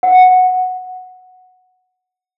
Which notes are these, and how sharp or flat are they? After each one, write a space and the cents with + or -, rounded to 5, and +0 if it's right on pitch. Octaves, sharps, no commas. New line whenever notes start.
F#5 -5